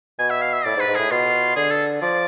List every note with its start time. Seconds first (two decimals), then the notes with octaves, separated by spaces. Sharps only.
0.19 B2 G#5
0.30 E5
0.42 F5
0.53 E5
0.65 A2 D5
0.76 G#2
0.80 B4
0.88 G#2
0.96 A2 G#4
1.11 B2 F4
1.56 D3 G#4
1.71 A4
2.02 F3 D5